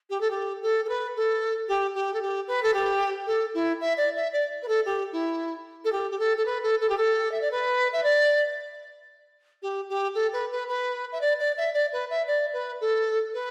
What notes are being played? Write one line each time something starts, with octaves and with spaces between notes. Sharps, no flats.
G4
A4
G4
A4
A4
B4
A4
G4
G4
A4
G4
B4
A4
G4
A4
E4
E5
D5
E5
D5
B4
A4
G4
E4
A4
G4
G4
A4
A4
B4
A4
A4
G4
A4
E5
D5
B4
E5
D5
G4
G4
A4
B4
B4
B4
E5
D5
D5
E5
D5
B4
E5
D5
B4
A4
B4